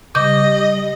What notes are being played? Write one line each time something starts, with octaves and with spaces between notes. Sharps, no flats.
C#3 G3 D#5 D6 G6